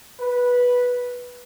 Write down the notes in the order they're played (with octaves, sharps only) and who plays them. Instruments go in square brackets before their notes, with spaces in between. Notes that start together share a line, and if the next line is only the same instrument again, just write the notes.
[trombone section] B4